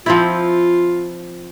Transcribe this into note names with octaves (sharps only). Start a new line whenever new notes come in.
F3 C4 E4 F4